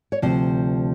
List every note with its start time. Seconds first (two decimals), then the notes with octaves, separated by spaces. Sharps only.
0.12 C#5
0.22 D2 C3 F3 C5